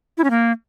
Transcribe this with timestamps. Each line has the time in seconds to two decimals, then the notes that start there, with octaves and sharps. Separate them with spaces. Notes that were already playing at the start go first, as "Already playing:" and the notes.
0.18 E4
0.24 C#4
0.30 A#3